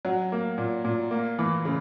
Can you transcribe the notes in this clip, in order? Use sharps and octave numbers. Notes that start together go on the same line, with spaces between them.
F#3
A#3
A#2
A#2
A#3
E3
C#3